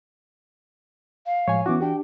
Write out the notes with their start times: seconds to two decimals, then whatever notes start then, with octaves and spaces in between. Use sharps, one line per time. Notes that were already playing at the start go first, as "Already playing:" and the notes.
1.26 F5
1.48 A2 F3 G#3 C#5 G#5
1.66 E3 B3 C#4 E4 F#4 D6
1.81 D4 G4 G5